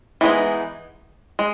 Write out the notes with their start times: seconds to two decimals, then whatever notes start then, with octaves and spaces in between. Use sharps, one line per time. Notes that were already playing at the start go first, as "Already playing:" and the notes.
0.21 E3 G#3 B3 D#4
1.39 G#3